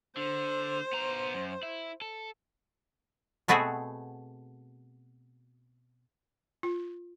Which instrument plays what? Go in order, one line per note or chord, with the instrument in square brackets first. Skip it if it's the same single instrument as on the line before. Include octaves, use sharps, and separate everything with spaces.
[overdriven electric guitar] D3 [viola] C5
[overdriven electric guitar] B3 A#5
F#2
E4
A4
[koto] B2 A3 B3 C4 F#4 G#4
[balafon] F4